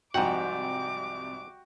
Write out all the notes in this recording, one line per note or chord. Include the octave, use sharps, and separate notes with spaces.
C2 G#2 C3 F3 F#4 F#5 G5 D6